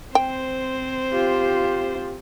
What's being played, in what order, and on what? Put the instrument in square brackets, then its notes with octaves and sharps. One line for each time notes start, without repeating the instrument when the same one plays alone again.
[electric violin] C4 C5 [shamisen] G5
[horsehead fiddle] F4 G4